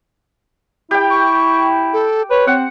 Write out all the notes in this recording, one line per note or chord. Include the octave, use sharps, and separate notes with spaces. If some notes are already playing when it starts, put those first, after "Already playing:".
E4 G4 G5
C#6
A4
B4 C#5
C4 F#5